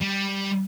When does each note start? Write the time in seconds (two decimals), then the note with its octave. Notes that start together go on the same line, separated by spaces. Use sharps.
0.01 G3